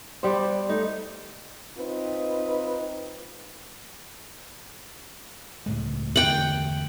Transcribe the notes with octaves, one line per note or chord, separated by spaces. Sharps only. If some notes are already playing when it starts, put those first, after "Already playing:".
G3 B3 C5 D5
A3 D#4
C4 D#4 F4 B4
C#2 A2 G#3
E2 D3 A3 F#5 G5